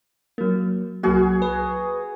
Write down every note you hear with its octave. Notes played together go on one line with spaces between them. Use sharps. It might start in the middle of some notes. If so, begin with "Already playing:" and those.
F#3 A#3
C2 F#3 A#3 F#4 G#4
B4